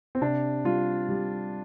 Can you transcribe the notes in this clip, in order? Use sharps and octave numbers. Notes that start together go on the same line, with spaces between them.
C4
C3 D4
G3 F4
G3